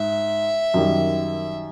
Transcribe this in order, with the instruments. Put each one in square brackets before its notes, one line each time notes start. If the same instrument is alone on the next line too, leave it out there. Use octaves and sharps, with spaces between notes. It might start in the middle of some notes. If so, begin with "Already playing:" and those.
Already playing: [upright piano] G#2 D#4 [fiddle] E5
[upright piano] F#2 D#3 G3